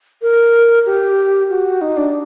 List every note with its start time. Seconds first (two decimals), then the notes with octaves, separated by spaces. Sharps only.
0.22 A#4
0.86 G4
1.49 F#4
1.81 D#4
1.97 D4